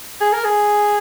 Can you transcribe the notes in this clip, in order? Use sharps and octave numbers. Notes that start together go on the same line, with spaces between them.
G#4
A#4
G#4